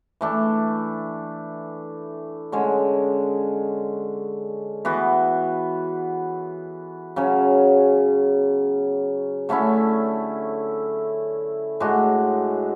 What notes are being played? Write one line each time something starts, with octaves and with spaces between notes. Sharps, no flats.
E3 A3 D4
D3 G#3 C#4
E3 B3 F#4
C#3 F#3 C#4
D3 A3 C#4 E4
A2 G#3 D4 F#4